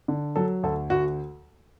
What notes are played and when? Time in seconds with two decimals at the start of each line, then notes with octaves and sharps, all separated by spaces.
0.08 D3
0.36 F#3 A4
0.63 D2 A4
0.90 D2 F#4